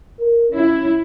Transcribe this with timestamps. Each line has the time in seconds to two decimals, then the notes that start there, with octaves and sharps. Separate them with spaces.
0.19 A#4
0.52 C#4 E4